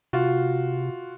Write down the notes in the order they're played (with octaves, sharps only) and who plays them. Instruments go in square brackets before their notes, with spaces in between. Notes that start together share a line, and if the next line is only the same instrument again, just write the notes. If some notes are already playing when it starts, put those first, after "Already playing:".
[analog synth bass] C3 [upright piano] F4 F#4